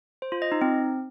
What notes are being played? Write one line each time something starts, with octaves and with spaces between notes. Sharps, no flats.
C5
F4
D#5
D#4
C4